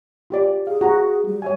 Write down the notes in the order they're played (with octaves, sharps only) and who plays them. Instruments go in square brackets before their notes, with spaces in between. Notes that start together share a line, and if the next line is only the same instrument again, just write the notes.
[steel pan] F4 G4 D5
[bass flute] G#4 [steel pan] F5
[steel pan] F#4 A#5
[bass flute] G3
[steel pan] C#5 E5 G#5